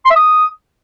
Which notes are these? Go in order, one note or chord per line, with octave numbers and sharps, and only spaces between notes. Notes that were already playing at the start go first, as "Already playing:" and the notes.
C6
E5
D#6